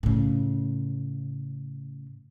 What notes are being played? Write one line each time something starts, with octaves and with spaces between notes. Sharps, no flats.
A2 C#3